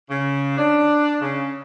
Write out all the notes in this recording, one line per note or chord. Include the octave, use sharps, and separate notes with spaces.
C#3
D4
C#3